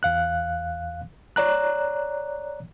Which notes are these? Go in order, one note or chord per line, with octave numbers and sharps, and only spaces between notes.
E2 F5 F#6
C#5 D5 A#5 F#6